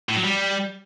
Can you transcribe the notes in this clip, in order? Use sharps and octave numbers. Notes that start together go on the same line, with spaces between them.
A2
F#3
G3